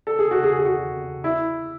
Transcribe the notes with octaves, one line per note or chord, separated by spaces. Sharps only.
A4
G#4
F#4
G#4
G#4
F#4
E4